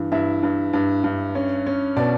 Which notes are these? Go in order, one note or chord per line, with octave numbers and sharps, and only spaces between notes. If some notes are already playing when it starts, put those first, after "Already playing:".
Already playing: G2 E3
G2 E4 E5
G2
G2
G2
C#4
C#4
B2 D4 D5